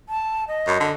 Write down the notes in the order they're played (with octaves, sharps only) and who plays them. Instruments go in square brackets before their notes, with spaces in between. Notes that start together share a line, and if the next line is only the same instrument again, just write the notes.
[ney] A5
D#5
[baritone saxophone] F#2
D3